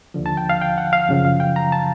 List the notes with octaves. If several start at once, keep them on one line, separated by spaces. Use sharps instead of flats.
D#2 D3 F3
A5
G5
F5
G5
F#5
F5
F#2 C#3 F3
F5
G5
A#5
A5